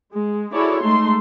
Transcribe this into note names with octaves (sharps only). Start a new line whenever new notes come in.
G#3
E4 F#4 G#4 A4 C#5 D5
G#3 A3 D#4 A4 C6